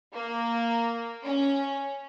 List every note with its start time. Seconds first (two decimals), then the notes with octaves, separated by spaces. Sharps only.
0.13 A#3
1.24 C#4